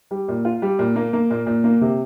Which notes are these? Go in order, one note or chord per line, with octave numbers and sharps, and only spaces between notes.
G3
A#2
F4
G3
A#2
A#3
A#3
A#2
A#2
A#3
C3